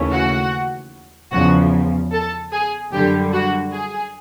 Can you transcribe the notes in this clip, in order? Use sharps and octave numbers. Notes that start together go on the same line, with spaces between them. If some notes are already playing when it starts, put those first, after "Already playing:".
Already playing: D#2 C#3 E3 A3 C#4
F#4 F#5
E2 C#3 F3 F#4 F#5
A4 A5
G#4 G#5
F#2 D3 G3 G4 G5
F#4 F#5
G#4 G#5